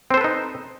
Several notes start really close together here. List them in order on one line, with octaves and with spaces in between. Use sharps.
C4 C5 A4 B4 D#4